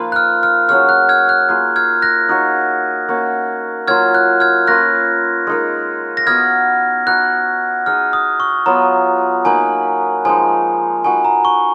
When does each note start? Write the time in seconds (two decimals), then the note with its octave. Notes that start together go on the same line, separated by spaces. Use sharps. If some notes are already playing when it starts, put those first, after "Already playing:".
Already playing: F3 A#3 D#4 F4 B4 F5
0.12 F#6
0.16 F6
0.43 F6
0.69 F#3 C#4 G#4 C#5 F6
0.89 F#6
1.09 F6 G#6
1.29 F#6
1.49 A#3 F4 G#4 F6
1.76 F6 G#6
2.02 F#6 A#6
2.29 D#4 F#4 C#5
3.09 A#3 C#4 F#4
3.88 F#3 A#3 F4 F6 G#6
4.15 F#6
4.40 F6 G#6
4.67 A#3 C#4 F4 B4 F#6 A#6
5.47 G#3 D#4 A#4
6.17 A#6
6.27 B3 F#4 B4 D#5 F6 G#6
7.07 D#4 F#4 B4 F#6
7.86 D#4 G#4 D#5 F6
8.13 D#6
8.40 C#6
8.66 F#3 B3 F4 B4 A#5
9.45 A#3 D#4 F#4 B4 G#5
10.25 F3 G#3 D#4 G#5
11.04 D#4 F#4 B4 G#5
11.25 A#5
11.45 C#6